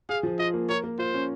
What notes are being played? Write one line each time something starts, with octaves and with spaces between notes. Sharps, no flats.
G#4 F5
F3
F4 D#5
A#3
A#4 C#5
A#3
F4 C5
C#4